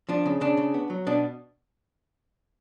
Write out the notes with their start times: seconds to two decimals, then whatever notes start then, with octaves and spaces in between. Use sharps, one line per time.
0.09 F3 D4
0.26 C#3
0.41 C#3 D4
0.57 C#3
0.74 B3
0.90 F#3
1.07 B2 D4